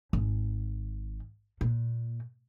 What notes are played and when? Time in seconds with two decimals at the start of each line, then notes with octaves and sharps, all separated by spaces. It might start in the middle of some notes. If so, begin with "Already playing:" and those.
0.13 G#1
1.61 A#2